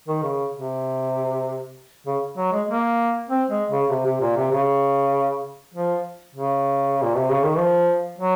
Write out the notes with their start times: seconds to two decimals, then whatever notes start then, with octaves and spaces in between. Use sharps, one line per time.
0.08 D#3
0.23 C#3
0.54 C3
2.07 C#3
2.37 F#3
2.52 G#3
2.69 A#3
3.30 C4
3.50 G#3
3.71 C#3
3.90 C3
4.06 C3
4.21 A#2
4.36 C3
4.52 C#3
5.74 F3
6.35 C#3
7.03 A#2
7.17 C3
7.31 C#3
7.44 D#3
7.58 F3
8.18 F#3